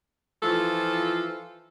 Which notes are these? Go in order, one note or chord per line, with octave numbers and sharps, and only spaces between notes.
E3 F3 F4 A4